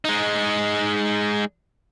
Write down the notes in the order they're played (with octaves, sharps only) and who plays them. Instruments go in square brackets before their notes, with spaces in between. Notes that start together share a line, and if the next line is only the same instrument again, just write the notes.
[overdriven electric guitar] G#3 D#4